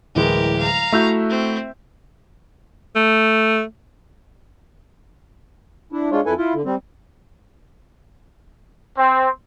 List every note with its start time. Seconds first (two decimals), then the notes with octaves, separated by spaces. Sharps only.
0.15 D1 E3 G#3 G4 A#4
0.58 F5 A#5
0.92 A3 E4 F#4 E5 E6 G6
1.30 C4
2.95 A3
5.92 D4 E4
6.11 G#3 D4 F4 C#5
6.26 F2 E4 A4 B4 G#5
6.38 E4 F4
6.54 D3
6.65 G3 C4
8.96 C4